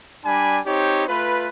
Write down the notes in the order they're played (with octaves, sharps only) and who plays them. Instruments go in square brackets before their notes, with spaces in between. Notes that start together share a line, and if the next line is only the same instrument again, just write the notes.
[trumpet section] G3 D4 G#5 B5
C4 D#4 G4 C#5
A3 F4 B4